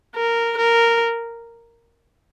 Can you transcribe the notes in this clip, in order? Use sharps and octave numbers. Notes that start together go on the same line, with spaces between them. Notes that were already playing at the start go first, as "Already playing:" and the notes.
A#4
A#4